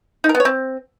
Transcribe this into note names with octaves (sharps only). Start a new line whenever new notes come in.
D#4
A#4
B3
C#5
C4